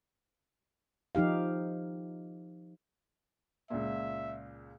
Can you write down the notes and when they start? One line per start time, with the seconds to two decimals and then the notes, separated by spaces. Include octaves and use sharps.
1.15 F3 D#4 G4 F5
3.70 C#2 A#2 E5